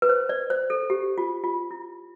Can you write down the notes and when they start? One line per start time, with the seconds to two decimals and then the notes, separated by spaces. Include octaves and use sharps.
0.02 B4
0.09 C5
0.29 D5
0.50 C5
0.70 A4
0.90 G4
1.18 F4
1.44 F4
1.71 E4